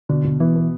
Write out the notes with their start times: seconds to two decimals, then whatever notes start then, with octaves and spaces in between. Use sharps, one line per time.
0.09 B2 D3
0.24 B2
0.40 E3 B3
0.55 B3